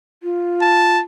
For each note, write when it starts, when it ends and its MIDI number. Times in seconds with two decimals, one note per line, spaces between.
0.23 0.97 65
0.61 1.01 81